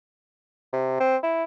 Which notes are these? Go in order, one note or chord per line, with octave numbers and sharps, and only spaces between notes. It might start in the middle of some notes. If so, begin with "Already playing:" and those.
C3
C4
E4